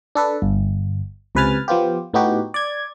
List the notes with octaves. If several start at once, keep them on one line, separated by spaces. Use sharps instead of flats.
D4 A4 B4
G1
C#2 C3 B4 G#5 F6 A6
F3 B3 F4 G4
A2 B3 D#4 F#4 G4
D5 G#6